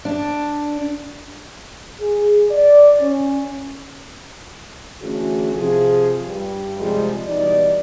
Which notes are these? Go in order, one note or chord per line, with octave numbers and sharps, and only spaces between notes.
D4
G#4
D5
C#4
D3 E3 A3 C#4 F#4 G#4
C3 F3 G#4
G2 G3
C3 F3 G3 G#3
B2 E3 G3 D#4 D5